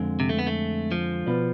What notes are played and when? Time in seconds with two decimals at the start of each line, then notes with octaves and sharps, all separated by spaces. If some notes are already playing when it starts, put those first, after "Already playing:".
Already playing: F2 D3 G#3 C4
0.20 C3
0.29 A3
0.39 B3
0.47 A3
0.92 F3
1.26 B2 B3 F4 B4 D5